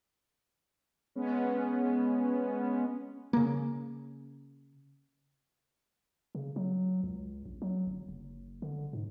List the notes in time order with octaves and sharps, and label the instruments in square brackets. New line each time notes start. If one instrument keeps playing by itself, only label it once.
[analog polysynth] G#3 B3 C#4
[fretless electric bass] C#3 A#3
[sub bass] C#3
F#3
C#2
A#1
F#3
G1
F#1
D3
G#2